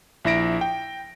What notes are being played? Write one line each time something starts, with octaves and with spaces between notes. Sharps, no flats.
A#1 E4 E5 A#6 D7
G5